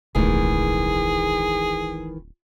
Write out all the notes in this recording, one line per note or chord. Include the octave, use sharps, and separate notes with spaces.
D1 B1 D#3 E3 G#3 A3 G#4